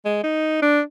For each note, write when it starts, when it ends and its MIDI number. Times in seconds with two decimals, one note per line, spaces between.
0.05 0.20 56
0.24 0.61 63
0.62 0.81 62